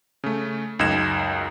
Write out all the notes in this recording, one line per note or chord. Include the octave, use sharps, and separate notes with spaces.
C#3 A3
C#2 F#2 D#4 G#6 E7